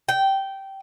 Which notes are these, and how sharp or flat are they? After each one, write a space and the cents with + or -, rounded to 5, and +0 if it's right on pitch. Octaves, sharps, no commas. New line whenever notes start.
G5 -15